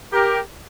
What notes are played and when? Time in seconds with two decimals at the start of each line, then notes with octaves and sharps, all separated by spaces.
0.12 G4 A#4